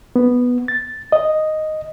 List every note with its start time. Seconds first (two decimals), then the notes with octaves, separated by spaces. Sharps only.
0.16 B3
0.68 A6
1.12 D#5